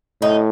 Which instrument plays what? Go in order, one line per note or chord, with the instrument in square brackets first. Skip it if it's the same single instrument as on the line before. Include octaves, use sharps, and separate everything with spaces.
[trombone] A2 [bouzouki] D#4